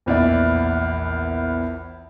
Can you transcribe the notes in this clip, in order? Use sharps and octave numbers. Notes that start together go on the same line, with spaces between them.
A#1 E2 D5 E5